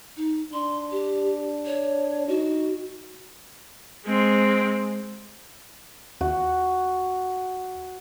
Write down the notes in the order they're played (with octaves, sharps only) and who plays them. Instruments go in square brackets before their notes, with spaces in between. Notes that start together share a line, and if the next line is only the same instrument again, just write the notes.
[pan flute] D#4
[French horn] D4 [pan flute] C6
[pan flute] G4
C#5
[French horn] D#4 [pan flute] F#4
[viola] G#3 C4
[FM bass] D#2 [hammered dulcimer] F#4